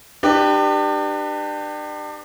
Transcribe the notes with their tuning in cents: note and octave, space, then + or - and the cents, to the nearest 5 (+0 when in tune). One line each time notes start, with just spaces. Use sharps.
D4 +35 G4 +0 B4 +0